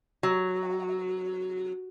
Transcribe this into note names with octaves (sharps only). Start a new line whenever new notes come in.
F#3